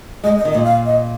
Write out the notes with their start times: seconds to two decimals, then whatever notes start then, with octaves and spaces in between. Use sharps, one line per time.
0.24 G#3 D#5
0.38 D#5
0.45 D#3
0.52 D#5
0.54 A#2
0.65 F5
0.86 D#5